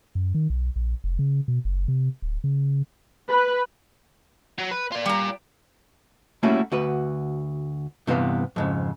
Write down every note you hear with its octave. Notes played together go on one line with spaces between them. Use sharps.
F#2
D#3
B1
A#1
F1
C#3
B2
F#1
C3
D1
C#3
B4
F#3
B4
F4 D5
G3 A#5
G3 A3 A#3 C#4 E4 F#4
D2 F#4 B4
G2 C3 E3 B3 F5
F2 G#2 C#3